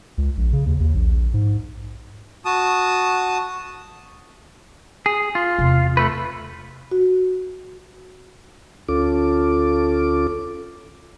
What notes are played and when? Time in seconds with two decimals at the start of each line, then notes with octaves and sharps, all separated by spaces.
0.18 C#2
0.37 A#1
0.53 C#3
0.66 D#2
0.80 D#2
0.95 A#1
1.34 G#2
2.45 F#4 A5 D#6
5.06 G#4
5.35 F4
5.59 E2 C3
5.97 A3 B4
6.91 F#4
8.89 D2 C#4 F4 A4 D6